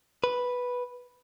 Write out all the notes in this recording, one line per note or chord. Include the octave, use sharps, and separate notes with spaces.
B4